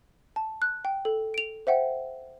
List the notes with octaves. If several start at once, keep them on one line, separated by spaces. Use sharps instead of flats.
A5
F#6
G5
A4
D7 F7
C5 E5 F#5 G5